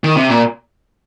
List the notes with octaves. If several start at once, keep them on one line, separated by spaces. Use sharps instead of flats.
D#3
C3
A#2